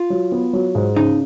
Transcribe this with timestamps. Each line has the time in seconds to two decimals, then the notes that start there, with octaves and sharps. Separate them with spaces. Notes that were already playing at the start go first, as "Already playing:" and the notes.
Already playing: F4
0.10 F#3
0.32 B3
0.53 F#3
0.75 G#2
0.96 C#3 D#4